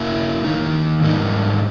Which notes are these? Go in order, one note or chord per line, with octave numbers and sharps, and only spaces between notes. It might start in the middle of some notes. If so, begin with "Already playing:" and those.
Already playing: A#3 E4 A#4 E5
D#3 A#3 D#4
G#2 G3 A#3 D#4